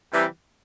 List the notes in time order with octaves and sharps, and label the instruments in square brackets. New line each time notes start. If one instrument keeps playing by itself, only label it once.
[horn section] C3 E3 G3